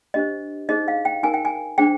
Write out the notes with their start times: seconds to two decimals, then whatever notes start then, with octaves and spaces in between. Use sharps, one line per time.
0.14 D4 G4 C5 D#5
0.69 D#4 G#4 C5 D#5
0.88 F5
1.05 G5
1.23 D#4 A#4 G#5
1.34 G5
1.45 G#5
1.78 D4 G#4 C5 G5